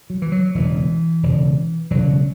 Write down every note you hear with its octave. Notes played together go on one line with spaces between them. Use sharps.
F#3
E3
F#3
E1 D2 C#3 E3
E1 D2 C#3
E1 D2 C#3 F#3